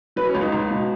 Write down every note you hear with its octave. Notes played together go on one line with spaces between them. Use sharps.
F#3 B4
C#4
C#2
D#4
C#2
B2